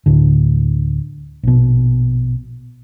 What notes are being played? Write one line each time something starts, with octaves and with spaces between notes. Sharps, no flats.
D2 A2 D3
A#1 B2